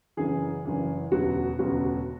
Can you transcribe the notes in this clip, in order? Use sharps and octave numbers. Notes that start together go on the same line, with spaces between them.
F#1 F#2 E3 G#4
F#1 F#2 E3
E1 D2 C#3 F#3 B3 F#4
E1 D2 C#3 F#3 B3 F#4